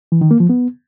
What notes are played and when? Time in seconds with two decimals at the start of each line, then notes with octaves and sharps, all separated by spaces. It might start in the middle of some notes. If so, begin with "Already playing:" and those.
0.12 E3
0.21 D#3
0.31 A#3
0.40 F3
0.49 B3